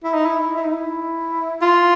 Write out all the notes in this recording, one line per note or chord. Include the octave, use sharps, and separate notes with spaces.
E4
D#4
E4
E4
D#4
E4
F4